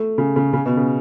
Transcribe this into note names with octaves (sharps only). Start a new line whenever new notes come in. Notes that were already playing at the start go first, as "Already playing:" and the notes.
Already playing: A3
C#3
C#3
C#3
B2
C#3